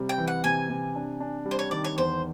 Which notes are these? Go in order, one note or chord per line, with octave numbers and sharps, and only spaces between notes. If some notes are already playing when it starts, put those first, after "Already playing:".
Already playing: C3 G3
G5
E3
F#5
C3 G#5
C3
D4
D4
G3
C5
C#5
D#3 D5
C#5
E2 C5